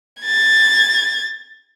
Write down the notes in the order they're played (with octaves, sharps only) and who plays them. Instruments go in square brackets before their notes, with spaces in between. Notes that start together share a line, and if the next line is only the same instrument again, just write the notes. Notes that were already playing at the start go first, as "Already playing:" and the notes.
[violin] G#6 A6